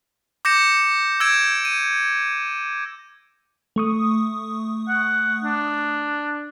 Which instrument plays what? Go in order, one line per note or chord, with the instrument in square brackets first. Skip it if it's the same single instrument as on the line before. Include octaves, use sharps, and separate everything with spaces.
[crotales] D6 G6 A#6 C#7 E7
E6 G6 G#6 D7 E7
D#7
[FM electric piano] A3 C#6 D#6
[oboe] F#5
D4